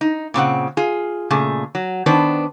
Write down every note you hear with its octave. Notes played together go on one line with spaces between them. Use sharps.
D#4
A#2 C#3 C4 F#5
F4 G#4
A#2 C#3 A3 G#4
F#3
D#3 B3 D4 B4 C5